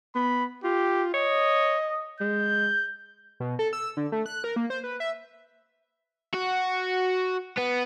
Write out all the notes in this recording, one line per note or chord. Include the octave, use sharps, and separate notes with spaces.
B3 B5
F4 G4
C#5 D#5
G#3 G6
B2
A4
E6
D3
A3
F#6
A#4
A#3
C5
B4
E5
F#4
B3